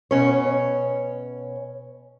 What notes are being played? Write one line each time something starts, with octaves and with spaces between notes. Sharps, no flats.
B2 C#4 C#5